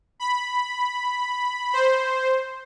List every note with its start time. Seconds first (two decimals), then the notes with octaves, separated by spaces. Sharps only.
0.20 B5
1.73 C5